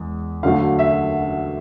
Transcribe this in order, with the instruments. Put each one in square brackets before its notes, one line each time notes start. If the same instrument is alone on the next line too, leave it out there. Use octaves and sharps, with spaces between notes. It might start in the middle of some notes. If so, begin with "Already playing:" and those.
Already playing: [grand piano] E2 G#3
D2 D3 F#3 A3 F5
E5